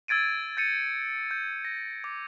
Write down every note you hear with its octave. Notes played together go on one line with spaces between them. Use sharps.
E6 G#6 A6 D7 D#7
G6 A6 C#7 D#7
G6
A#6
D6